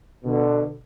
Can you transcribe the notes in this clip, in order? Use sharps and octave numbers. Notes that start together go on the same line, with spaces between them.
B2 D3